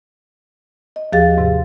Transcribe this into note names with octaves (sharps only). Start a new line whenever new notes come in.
D#5
D#2 F3 G4 G#4 F5 A6
G#2 C3